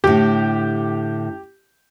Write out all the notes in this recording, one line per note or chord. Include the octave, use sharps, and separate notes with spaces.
A2 D3 G4